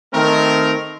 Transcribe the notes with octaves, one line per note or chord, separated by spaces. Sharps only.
D#3 A3 C4 A#4